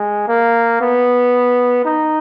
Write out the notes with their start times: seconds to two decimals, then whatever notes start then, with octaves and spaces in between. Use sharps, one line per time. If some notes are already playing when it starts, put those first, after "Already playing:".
Already playing: G#3
0.28 A#3
0.81 B3
1.85 D#4